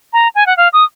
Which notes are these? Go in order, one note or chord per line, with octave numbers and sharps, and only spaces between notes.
A#5
G#5
F#5
F5
D#6